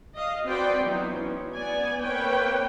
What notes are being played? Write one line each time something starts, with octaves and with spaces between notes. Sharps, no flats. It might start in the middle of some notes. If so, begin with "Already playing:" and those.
D#5 F5
C4 F#4 B4 D5 G5 C6
E3 F#3 B3 D#4 E4
C#4
B3 D5 G#5
A#3 C4 B4 C#5 G5